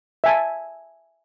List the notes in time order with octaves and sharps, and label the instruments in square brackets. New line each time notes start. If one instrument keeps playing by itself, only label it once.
[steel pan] E5 G#5 A5